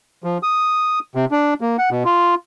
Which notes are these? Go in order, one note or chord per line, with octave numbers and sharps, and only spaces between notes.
F3
D#6
C3
D4
A#3
F#5
B2
F4